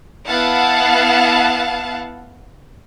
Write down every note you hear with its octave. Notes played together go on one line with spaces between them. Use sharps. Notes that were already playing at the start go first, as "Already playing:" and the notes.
B3 E4 F5 F#5 A5